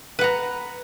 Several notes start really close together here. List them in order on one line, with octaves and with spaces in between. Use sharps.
B4 F#5 A#5